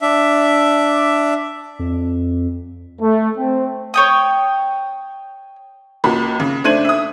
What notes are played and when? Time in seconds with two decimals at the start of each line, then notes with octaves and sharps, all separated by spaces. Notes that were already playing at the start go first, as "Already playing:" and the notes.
0.01 D4 E5
1.79 F2
3.01 A3
3.37 C4
3.94 C#5 G5 D#6
6.04 C#2 A#3 F#4 B5
6.40 C#3
6.64 A3 D4 C5 G#6 D#7 F#7
6.85 E5 D#6